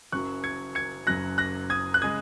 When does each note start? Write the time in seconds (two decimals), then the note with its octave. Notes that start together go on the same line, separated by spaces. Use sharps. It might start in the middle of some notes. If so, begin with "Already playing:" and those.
0.12 F#1 F#2 C#3 F#3 C#6 F#6
0.44 G#6 C#7
0.75 G#6 C#7
1.07 F#1 F#2 C#3 F#3 F#6 A#6
1.38 F#6 A#6
1.70 D#6 G#6
1.94 F#6
2.02 C#3 G#3 D#6 G#6